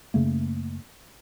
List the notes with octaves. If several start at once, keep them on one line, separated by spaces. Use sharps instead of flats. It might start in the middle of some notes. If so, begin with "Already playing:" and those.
F#2 C#3 A3 A#3